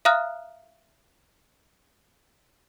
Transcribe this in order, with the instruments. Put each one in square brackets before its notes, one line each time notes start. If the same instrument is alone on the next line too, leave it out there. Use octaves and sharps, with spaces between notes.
[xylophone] E5 F5 A#5 D#6 F6 F#6